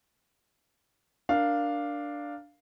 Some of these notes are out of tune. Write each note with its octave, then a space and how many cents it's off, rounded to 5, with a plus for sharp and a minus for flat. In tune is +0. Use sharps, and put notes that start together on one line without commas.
D4 +0 A#4 +0 F5 +0